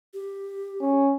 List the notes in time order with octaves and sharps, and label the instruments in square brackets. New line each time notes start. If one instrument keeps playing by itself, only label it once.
[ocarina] G4
[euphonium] C#4